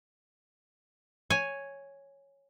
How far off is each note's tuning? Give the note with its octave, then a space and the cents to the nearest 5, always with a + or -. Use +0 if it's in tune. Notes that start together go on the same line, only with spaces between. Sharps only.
C#5 +0 G#5 +0